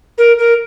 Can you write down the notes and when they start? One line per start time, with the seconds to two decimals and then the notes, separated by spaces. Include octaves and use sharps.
0.18 A#4
0.39 A#4